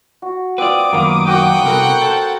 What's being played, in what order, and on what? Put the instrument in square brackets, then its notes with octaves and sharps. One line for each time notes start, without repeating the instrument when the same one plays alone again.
[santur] F#4
[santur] C4 F4 [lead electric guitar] B4 D5 [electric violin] D6 D#6
[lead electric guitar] F#2 D#3 [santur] A#3 B3
[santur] F#4 A#4 [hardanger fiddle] F#5 G5
[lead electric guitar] C2 C3 [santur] B3 A4 A#4
[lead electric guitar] A4 [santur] C5